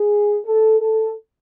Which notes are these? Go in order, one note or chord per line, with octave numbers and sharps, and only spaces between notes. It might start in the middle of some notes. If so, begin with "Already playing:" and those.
Already playing: G#4
A4
A4